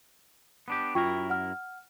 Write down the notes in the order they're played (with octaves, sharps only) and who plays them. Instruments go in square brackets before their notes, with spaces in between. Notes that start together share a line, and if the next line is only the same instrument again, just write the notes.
[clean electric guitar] B3 D4 G4
[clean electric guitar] F#2 E4 A#4 [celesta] F4 G5 C#6
[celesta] F#5 F6